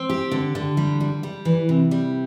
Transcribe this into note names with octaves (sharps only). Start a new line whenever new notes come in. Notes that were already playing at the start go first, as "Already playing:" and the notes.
Already playing: C4
G4
D3
D3
G3
G3
G3
E3
C3
G3